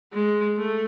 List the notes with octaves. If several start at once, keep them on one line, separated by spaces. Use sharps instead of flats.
G#3
A3